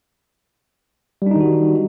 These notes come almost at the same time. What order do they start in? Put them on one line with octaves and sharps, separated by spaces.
G3 D4 D#4 D#3 F#4